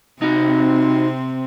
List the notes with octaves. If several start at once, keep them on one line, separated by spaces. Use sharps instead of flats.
C3 C4 D#4 F#4